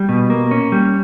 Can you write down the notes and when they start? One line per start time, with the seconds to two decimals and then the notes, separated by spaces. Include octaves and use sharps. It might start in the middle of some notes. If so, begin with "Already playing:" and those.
Already playing: G3
0.09 B2
0.30 A#3
0.51 C#4
0.72 G3